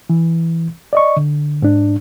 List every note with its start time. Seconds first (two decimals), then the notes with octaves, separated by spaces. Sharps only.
0.10 E3
0.93 D5 D#5 C#6
1.17 D3
1.62 G#2 D4